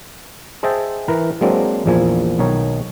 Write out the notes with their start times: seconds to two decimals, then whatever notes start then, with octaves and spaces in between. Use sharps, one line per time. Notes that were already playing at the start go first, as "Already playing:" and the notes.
0.63 G#4 C5 D#5 E5 G5 A5
1.08 E3 A#4 B4 A#5
1.41 F#3 G#3 A#3 C4 D4
1.86 A#1 E2 A#2 F3 A#3 G#5
2.39 B1 D#3 D#4 C#5